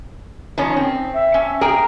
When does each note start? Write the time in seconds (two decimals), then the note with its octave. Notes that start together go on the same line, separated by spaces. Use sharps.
0.58 D#3 F3 C#4
0.77 C4
1.14 E5
1.34 C#4
1.61 G#4 A#4 G5 A#5